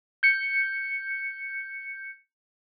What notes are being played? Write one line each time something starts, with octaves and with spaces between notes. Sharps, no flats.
G6 C#7